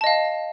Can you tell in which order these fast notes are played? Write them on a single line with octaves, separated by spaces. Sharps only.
A5 D#5 F5